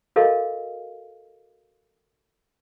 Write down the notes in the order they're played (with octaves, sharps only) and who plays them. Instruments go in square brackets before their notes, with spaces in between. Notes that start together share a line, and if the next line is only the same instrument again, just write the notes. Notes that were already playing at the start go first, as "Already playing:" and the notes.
[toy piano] F#4 A4 A#4 D#5 F5